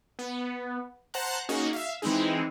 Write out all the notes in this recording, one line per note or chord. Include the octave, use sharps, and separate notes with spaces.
B3
C5 F#5 A5 A#5 F#6
A#3 C#4 D#4 F#4 G#4
E5 F5
E3 G#3 C4 D#4 E4 G#4